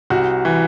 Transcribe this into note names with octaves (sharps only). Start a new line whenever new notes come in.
C2 F#4
E3